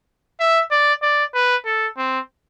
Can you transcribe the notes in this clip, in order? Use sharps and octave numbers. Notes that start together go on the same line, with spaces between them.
E5
D5
D5
B4
A4
C4